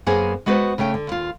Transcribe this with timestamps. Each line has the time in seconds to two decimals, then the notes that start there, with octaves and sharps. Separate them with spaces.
0.06 F#2 A#3 B3 G#4 C5 G#5
0.46 G#3 B3 F#4 B4 C5
0.78 C#3 A3 C#4 G5
0.94 D3
1.07 D#2 F4